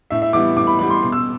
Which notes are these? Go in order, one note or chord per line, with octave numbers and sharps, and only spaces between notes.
A2 E5
E5
E3 G3 B3 D6
A2 D6
B5
E3 G3 B3 B5
C6
B2
E6